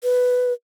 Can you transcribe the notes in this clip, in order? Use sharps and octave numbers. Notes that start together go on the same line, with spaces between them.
B4